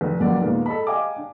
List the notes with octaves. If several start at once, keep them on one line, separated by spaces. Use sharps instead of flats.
F1
F1 C#2 F#2 A#3 D5 F#5
D#2 A#2 G#3 A#3 B3
A4 D#5 B5
D#5 F5 G5 G#5 D6
D4